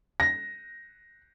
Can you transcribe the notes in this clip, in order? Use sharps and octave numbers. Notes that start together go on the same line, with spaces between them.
A#6